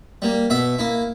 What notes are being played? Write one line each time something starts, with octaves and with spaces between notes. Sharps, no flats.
G3 A#3
B2 E5
A#3 E4